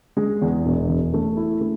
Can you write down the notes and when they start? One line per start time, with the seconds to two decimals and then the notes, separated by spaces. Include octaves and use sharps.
0.17 G#3
0.41 E2
0.65 E1
0.88 E2
1.14 A3
1.37 E4
1.61 A3